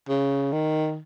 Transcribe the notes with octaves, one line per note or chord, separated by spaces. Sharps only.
C#3
D#3